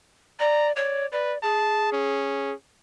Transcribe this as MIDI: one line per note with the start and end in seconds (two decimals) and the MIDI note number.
0.39 0.72 74
0.39 0.68 82
0.76 1.06 73
0.76 1.07 74
1.12 1.34 71
1.12 1.38 74
1.43 2.53 68
1.43 1.90 81
1.92 2.53 61